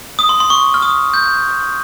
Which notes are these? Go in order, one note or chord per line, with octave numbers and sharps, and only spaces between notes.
D#6
C6
C6
C#6
F6
D#6
G6